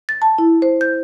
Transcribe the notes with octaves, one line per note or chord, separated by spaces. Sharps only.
A6
A5
E4
C5
G6